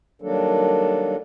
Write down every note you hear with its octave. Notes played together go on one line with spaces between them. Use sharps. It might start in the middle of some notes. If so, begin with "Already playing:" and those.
D#3 F#3 G3 A#3 D4 A4